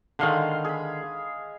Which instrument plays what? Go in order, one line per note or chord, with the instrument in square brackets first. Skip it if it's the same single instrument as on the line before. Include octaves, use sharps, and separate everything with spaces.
[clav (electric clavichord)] D3 D#3 [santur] G#3 F5 C6
[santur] G#4 B5